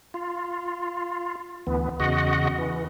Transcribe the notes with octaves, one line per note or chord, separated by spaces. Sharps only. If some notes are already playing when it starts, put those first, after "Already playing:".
F4
D2 E3 B3
E2 C#3 F#4 D#5 F#5
E3